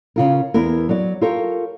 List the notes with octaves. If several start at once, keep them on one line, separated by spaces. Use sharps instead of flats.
C#3 F4 A#4
E2 B3 E4 A#4
F#3 D5
F4 G4 A4 A#4 C#5